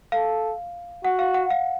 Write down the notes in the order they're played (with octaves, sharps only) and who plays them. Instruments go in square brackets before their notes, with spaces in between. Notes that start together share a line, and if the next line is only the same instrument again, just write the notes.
[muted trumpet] A4 [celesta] F5
[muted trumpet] F#4 [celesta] F#5
[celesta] F5
F#5
F5